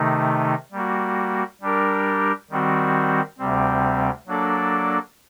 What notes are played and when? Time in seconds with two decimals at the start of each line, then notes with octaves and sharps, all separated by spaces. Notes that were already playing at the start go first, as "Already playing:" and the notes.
Already playing: C3 D#3 A3 D#4
0.72 G3 A#3 F#4
1.61 G3 D4 G4 A#4
2.51 D#3 G3 C4 F#4
3.38 D2 C3 G3 C4
4.27 F#3 A#3 D4 A4 D5